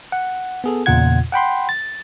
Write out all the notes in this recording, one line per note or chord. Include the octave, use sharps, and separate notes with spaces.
F#5
B3 G#4 A4
E2 A#2 C#3 F4 F#5 G#6
F#5 G5 B5 C6
A6